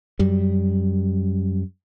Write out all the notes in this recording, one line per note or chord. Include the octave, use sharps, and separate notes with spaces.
F#2 G3